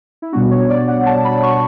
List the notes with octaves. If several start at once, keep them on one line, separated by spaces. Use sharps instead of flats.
E4
B2 G3 B3 D4 F#4
C#5
D5
F#5
A5
B5
C#6